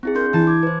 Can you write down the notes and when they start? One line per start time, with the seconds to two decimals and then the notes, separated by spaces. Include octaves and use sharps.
0.03 C4 E4 G#4
0.15 D4 A#4 C6 G6
0.33 E3 E4 A5
0.47 D6 G#6
0.63 B4 C5